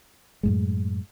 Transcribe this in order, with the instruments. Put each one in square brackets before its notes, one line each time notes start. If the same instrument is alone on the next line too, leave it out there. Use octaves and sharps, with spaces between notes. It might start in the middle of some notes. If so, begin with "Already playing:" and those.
[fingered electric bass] F#2 A2 G#3